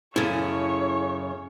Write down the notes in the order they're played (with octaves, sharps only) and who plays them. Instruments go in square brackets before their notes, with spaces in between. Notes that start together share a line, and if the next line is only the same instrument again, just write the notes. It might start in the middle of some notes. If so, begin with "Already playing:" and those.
[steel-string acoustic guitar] F#2 C#3 [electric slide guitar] E4 G#4 A4 [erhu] C#5